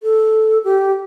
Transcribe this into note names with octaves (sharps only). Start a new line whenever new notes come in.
A4
G4